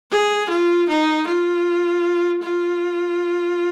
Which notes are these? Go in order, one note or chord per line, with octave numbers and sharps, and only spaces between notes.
G#4
F4
D#4
F4
F4